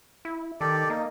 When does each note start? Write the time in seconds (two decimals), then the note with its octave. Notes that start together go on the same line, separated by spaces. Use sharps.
0.25 E4
0.61 D#3 G4 A4 D5
0.90 A#3 D#4